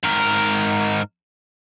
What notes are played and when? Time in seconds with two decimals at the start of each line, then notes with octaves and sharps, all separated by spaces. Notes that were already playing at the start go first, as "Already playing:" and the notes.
0.03 G#2 A#4